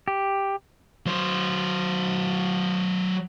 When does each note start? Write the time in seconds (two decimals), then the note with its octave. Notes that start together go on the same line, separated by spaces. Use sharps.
0.08 G4
1.06 F#3 C5